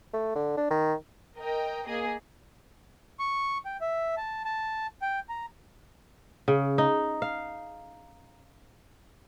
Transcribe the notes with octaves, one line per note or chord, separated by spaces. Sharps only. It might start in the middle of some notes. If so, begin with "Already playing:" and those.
A3
D3
D4
D#3
A#4 D#5 G5
A#3 G#4 D#5
C#6
G5
E5
A5
A5
G5
A#5
C#3
D#4
F5